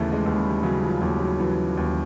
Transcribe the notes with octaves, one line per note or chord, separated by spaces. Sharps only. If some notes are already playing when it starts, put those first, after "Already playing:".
Already playing: D#2 C#3 E3 A3 B3
G#3
D#2
G3
C#3 F#3
F3
D#2 F#3
F#3
E3 F#3
D#2